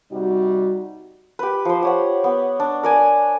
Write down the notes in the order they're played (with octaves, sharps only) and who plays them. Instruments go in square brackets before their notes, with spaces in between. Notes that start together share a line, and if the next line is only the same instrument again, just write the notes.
[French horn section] C3 G3 D#4 F#4
[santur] G4 B4
F3 C5
G4 C#5 F#5
B3
D4
A#4 D5 G#5